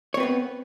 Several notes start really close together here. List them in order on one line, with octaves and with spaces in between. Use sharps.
C#5 C4 B4 B3